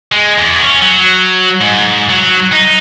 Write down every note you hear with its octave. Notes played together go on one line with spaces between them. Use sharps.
G#3
E2
C#4
F#3
G#2
F#3
D#4